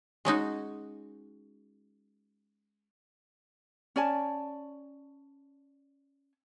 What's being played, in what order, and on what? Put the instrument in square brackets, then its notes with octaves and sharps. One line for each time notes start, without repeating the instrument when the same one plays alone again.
[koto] G#3 C#4 D#4 F#4
[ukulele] C#4 D5 G#5 A5